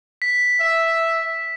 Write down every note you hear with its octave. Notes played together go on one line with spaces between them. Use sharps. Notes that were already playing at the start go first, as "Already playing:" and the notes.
B6
E5